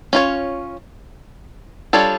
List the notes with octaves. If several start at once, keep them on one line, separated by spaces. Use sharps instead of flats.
C#4 F4 C#5
G3 D4 F4 A4 C#5